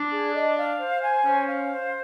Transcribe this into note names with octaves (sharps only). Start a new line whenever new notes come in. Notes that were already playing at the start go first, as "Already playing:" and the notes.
Already playing: D4
G#4
D#5
F5
C5
G#5
C#4 C5
F5
C5